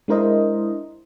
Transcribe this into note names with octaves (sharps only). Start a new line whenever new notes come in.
G#3 D4 E4 A#4 C5 D#5